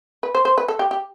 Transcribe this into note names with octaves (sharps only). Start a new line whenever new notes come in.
B4
C5
C5
B4
A4
G4
G4